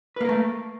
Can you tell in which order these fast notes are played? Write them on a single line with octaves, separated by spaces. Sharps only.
B4 A#3 A#4 A3